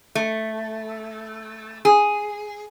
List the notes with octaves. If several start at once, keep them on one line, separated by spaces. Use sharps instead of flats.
A3
G#4